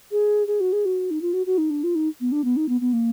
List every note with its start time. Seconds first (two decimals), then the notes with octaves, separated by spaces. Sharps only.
0.11 G#4
0.47 G#4
0.60 F#4
0.72 G#4
0.85 F#4
1.10 D#4
1.22 F4
1.33 F#4
1.46 F#4
1.58 D#4
1.70 D4
1.83 F4
1.95 D#4
2.20 B3
2.32 D4
2.44 B3
2.56 D#4
2.68 B3
2.81 B3
2.93 A#3